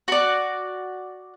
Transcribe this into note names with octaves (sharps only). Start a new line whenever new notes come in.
F#4 D5